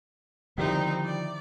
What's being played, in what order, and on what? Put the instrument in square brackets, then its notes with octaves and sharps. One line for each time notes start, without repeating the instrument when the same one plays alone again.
[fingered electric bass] D3 F3 [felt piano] D#3 G3 E4 [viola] C4 D#4
[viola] D5